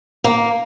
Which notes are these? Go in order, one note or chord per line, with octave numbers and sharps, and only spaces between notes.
A#3